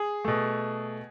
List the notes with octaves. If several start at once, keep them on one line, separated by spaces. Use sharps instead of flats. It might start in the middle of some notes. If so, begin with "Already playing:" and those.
Already playing: G#4
B2 A3